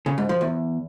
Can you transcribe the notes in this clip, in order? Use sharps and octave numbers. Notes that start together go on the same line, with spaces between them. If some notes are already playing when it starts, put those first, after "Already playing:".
C#3
G#2
F3
E2